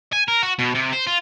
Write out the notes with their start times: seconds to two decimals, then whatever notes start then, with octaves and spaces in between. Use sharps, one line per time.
0.13 G#5
0.28 A#4
0.43 F#4
0.59 B2
0.75 C3
0.92 C5
1.07 F4